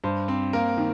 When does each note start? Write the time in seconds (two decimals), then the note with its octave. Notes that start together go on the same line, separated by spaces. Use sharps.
0.04 G2 C5
0.28 C4
0.53 A#3 A#4
0.78 D#3